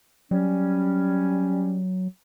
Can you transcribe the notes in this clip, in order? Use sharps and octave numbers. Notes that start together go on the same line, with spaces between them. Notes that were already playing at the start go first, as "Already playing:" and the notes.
F#3 G3 C#4